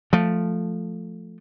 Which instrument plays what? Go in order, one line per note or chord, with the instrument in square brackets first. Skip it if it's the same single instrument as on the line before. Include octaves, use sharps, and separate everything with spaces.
[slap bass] F3 A3